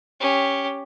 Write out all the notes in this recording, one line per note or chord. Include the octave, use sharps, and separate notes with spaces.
C#4 G4